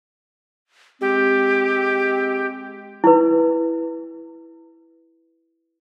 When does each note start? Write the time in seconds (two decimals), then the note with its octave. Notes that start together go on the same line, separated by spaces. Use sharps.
1.01 G#3 C4 G4
3.04 E4 B4